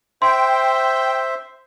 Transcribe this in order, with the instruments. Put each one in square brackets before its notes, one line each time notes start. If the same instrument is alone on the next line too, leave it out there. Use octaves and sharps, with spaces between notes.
[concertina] C5 E5 [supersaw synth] G5 [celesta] C6